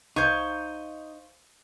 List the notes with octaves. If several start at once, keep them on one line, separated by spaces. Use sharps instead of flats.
C2 D#4 C5 F5 C#6 G#6